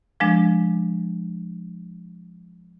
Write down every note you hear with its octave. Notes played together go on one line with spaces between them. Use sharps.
F3 G#3 D4